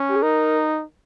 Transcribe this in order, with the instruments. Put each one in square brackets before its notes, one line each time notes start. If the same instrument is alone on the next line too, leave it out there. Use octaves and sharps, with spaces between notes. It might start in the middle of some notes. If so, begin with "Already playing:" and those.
Already playing: [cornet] C#4
[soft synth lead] G4
G#4
[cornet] D#4 [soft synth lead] A#4